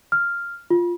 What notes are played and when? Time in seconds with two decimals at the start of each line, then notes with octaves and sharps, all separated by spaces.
0.12 F6
0.70 F4